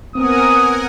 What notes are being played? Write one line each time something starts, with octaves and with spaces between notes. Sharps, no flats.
B3 C4 A#4 F#5 G#5 D#6